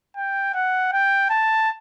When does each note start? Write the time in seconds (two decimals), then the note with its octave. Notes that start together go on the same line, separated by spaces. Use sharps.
0.17 G5
0.55 F#5
0.93 G5
1.30 A5